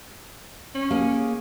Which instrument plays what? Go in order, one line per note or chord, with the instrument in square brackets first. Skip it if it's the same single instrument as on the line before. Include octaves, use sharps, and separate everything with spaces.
[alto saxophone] C#4
[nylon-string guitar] A#3 G#4